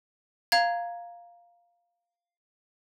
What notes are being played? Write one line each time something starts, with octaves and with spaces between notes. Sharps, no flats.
F5 A#5 G#6